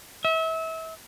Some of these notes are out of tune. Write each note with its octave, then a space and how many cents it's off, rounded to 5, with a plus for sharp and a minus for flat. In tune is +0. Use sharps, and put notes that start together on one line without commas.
E5 -30